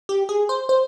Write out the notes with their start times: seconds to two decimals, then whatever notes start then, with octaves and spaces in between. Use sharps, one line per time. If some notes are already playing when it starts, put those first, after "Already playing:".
0.09 G4
0.29 G#4
0.49 C5
0.69 C5